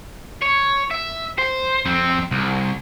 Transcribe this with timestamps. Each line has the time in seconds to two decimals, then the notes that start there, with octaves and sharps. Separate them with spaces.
0.42 C#5
0.91 E5
1.38 C5
1.85 F2 C4
2.31 C2